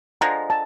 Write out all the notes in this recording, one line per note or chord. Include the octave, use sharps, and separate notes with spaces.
D3 F3 G#3 A#5
A5